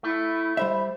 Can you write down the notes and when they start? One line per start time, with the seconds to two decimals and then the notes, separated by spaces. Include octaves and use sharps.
0.03 A3 E4
0.57 G3 C5 E5 B5